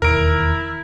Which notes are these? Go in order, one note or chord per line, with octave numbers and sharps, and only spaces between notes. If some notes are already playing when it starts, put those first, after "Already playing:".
E1 D#2 D#3 E4 A#4 D7